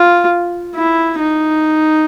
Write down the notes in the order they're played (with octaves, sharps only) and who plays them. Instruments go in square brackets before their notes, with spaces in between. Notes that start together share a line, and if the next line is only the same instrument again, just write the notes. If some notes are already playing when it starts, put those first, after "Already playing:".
Already playing: [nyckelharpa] F4
E4
D#4